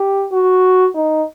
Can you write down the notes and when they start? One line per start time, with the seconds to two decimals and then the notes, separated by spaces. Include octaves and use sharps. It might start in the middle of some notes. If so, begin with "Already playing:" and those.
Already playing: G4
0.32 F#4
0.95 D#4